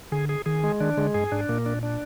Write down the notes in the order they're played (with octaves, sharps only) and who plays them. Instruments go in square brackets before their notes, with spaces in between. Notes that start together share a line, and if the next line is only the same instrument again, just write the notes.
[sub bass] D3 [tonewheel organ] G#4
[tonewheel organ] G#4
[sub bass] D#3 [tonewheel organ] G#4
[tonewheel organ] G#3
[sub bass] D#3 [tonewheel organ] D4
[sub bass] D3 [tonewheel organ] G#3
[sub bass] G2 [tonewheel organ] G#4
[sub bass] G#2 [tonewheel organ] D4
[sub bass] A#2 [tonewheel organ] A#3
[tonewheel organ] D4
D4